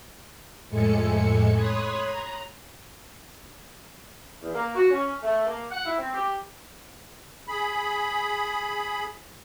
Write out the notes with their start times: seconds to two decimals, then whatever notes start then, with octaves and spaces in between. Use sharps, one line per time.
0.69 F2 A2 G#3 A4 G#5 C#7
1.53 C#5 B5 C6 D#6 F#6 G#6
2.04 A#5
4.42 E2
4.55 A#3
4.75 F#4
4.90 C#4
5.23 A3
5.46 A#3
5.71 F#5
5.85 E4
5.98 C4
6.14 G4
7.47 G#4 B5